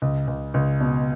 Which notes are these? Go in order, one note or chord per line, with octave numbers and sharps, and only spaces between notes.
C#2
C#2
C#2
B2